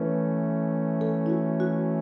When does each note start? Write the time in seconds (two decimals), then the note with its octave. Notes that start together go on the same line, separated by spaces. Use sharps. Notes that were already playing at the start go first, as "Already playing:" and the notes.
Already playing: E3 A3 C#4 B4
1.01 A4
1.26 E4
1.30 F#4
1.60 F#4